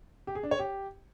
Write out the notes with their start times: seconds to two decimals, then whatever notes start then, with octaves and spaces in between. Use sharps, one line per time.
0.27 G4
0.35 G#4
0.43 D4
0.51 C#5
0.59 G4